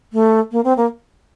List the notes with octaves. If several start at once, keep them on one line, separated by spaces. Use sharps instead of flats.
A3
A#3
C4
A#3